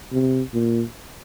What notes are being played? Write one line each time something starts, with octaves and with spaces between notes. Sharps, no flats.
C3
A#2